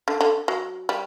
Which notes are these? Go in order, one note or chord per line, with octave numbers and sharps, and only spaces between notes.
D3
D3
F#3
G3